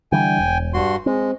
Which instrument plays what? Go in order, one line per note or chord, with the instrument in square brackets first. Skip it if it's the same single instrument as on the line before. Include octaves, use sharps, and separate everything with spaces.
[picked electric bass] D3 E3 G3 [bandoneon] G5 G#5
[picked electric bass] E1
[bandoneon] G2 F#4 C6
[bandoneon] G#3 [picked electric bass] C4